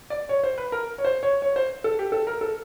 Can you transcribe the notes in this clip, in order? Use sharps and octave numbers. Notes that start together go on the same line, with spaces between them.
D5
C#5
C5
B4
A#4
C#5
C5
C#5
C#5
C5
A4
G4
A4
A#4
A4